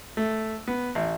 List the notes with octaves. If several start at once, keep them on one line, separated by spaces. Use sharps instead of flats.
A3
B3
A1